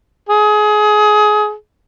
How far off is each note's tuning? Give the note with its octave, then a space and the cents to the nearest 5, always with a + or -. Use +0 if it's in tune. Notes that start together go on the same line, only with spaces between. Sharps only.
G#4 +25